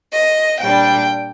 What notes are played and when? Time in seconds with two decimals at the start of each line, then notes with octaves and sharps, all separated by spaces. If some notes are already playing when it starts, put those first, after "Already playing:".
0.12 D#5
0.60 A#2 G3 D4 G5